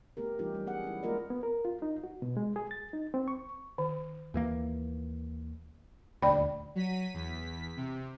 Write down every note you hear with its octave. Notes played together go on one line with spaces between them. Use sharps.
A3 B3 G4 A#4
E3 G3 C#4 D#4 F4 G4
F#3 G3
B3 G#4 F#5
C#4 E4
G#3 A#3 F4 A#4 D5 D#5
B3
A#4
F4
D#4
F#4
B2
G#3
G#4
A6
D#4
C4
C#6
D#3
D#2 E3 A#3
D#1 D2 D5 G5 B5
F#3 B6 D#7
E2 B6
C3